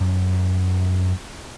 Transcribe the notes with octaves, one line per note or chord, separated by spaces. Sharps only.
F#2